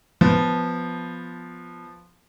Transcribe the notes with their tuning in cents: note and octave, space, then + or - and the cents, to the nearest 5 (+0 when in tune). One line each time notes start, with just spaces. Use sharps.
F3 +0 B3 +0